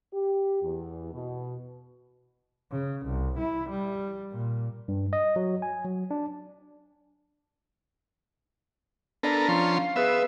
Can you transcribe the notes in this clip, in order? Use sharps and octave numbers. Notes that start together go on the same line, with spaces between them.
G4
E2
B2
C#3
C2
E4
G3
A#2
G2
D#5
F#3
G#5
F#3
D4
B3 D4 A4 A#4 D5 A#5
F3 C#4 C6
F5
B3 G#4 B4 E5 F5